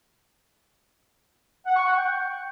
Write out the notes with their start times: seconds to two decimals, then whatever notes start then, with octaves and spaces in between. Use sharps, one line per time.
1.66 F#5
1.77 C#6
1.87 F#5
1.97 G5